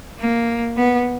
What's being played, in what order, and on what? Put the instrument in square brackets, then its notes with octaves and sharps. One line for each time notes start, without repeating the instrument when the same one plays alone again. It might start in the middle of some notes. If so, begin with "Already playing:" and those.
[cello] A#3
B3